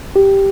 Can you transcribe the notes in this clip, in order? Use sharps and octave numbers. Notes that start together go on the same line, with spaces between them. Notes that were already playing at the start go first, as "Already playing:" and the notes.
G4